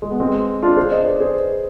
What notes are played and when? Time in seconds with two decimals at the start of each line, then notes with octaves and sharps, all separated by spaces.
0.02 G#3
0.11 B3
0.20 G#3 C4
0.63 D4 F4
0.77 G#4 C5
0.91 C5 D#5
1.06 B4 D5
1.20 G#4 C5